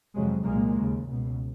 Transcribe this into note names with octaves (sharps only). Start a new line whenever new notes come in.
F2 C3 F#3 G#3
C2 A#2 G#3 A#3
D#2 C#3
C#2 B2